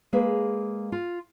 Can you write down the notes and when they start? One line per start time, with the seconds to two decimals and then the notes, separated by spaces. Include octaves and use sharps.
0.13 G#3 A#3 G#4 A#4 B4
0.92 F4